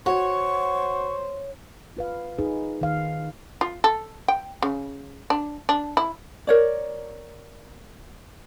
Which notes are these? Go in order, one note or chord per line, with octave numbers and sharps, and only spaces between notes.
F#4 C5 C#5 C#6
F4 B4 F5
D#4 G#4 B4
D#3 F5
F4
A4
G5
C#3
D4
D4
E4
A#4 C#5 D5